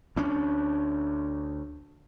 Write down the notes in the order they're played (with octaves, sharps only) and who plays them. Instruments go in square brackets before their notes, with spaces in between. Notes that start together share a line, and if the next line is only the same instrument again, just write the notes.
[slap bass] D2 C#4 D4